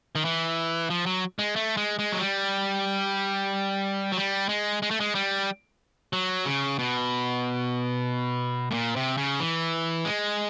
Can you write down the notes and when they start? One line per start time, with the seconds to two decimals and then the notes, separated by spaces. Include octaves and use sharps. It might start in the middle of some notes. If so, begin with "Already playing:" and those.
0.15 D#3
0.25 E3
0.90 F3
1.06 F#3
1.39 G#3
1.56 A3
1.77 G#3
1.99 G#3
2.12 F#3
2.21 G3
4.12 F#3
4.17 G3
4.49 G#3
4.82 G#3
4.91 A3
5.00 G#3
5.15 G3
6.13 F#3
6.46 C#3
6.79 B2
8.71 A2
8.74 A#2
8.96 C3
9.17 C#3
9.40 E3
10.05 G#3